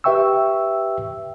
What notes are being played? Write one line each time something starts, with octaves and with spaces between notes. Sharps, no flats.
G4 B4 E5 G5 C#6 E6